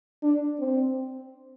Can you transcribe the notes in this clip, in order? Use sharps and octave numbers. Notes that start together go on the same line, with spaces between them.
D4
C4